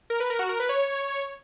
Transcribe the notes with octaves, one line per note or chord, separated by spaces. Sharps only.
A#4
B4
A#4
F#4
A#4
B4
C#5